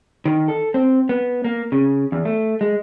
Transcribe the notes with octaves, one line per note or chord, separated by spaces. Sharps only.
D#3
A4
C4
B3
A#3
C#3
E2
A3
G#3